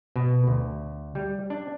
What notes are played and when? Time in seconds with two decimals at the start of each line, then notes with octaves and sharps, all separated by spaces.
0.16 B2
0.47 D2
1.15 G3
1.50 D4